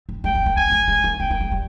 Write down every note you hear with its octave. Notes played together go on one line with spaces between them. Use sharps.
C4
G#3 G5
C4
A#3
C4 G#5
A#3
G#3
A#3
C4 G5
A#3
G#3
G3